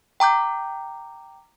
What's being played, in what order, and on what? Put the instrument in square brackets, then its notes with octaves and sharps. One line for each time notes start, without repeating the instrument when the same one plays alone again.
[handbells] G5 A#5 D6 G6